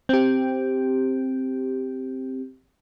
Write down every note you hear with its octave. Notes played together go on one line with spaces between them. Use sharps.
C4 G4